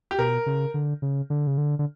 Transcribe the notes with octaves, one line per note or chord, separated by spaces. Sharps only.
G4
B2 A#4
C#3
D3
C#3
D3
C#3
D3
D3